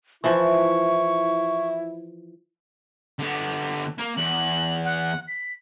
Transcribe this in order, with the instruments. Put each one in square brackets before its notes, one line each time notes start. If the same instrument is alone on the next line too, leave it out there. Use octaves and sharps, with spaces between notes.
[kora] E3 F3 [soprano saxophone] E4 [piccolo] C#6
[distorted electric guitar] D3 B3
A#3
[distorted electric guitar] E2 [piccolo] F#7
[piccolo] F#5
B6